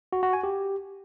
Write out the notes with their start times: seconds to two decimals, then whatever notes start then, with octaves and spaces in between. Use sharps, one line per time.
0.13 F#4
0.23 F#4
0.33 G#5
0.44 G4